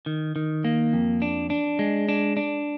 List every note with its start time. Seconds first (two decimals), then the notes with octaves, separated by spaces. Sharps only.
0.06 D#3
0.36 D#3
0.64 A#3
0.93 F2
1.22 D4
1.50 D4
1.79 G#3
2.09 D4
2.37 D4